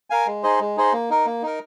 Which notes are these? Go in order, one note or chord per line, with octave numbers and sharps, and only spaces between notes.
A#4 F5 G#5
G#3
D#4 G#4 C5 D#5
G#3
D#4 G#4 C5 D#5
A#3
D#4 A#4
A#3
D#4 A#4